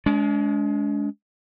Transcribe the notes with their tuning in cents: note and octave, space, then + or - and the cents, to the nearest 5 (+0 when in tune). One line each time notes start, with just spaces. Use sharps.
G#3 +20 D4 -40